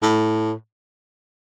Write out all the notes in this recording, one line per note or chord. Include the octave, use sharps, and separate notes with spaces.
A2